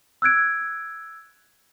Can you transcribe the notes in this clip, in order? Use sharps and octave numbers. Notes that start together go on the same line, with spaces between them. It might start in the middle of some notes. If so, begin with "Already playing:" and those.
E6 F#6 G#6 D7